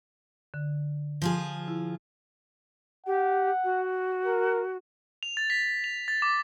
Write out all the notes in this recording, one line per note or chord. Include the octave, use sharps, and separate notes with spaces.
D3
F3 F4 G#4
E4
G4 F#5
F#4
A#4
F7
A6
B6
F7
A6
D6